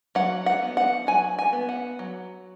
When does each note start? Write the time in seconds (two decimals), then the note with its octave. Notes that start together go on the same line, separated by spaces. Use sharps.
0.15 F#3 F#5
0.46 F#5
0.62 B3
0.77 F#5
1.07 F#3 G#5
1.39 G#5
1.53 B3
1.69 F#5
1.99 F#3